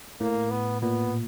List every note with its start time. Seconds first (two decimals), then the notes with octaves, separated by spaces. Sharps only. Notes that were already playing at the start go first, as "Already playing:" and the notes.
0.21 A2 A#3
0.51 B3
0.82 A#2 B3